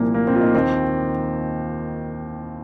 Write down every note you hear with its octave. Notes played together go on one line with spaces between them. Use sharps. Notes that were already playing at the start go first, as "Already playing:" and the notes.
Already playing: C2 A#2 F3 A#3
A#3
C4
F4
A#3 D#4
D#2 D#3 C4